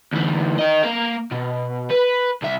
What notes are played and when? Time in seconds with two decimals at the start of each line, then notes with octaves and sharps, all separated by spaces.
0.12 D2 E3
0.59 A#4 D#5
0.84 A#3 F5
1.32 B2
1.90 B4
2.42 C2 E5